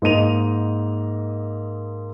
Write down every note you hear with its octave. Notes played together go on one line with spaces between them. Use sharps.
G#2 A#3 D#5 D#7 F7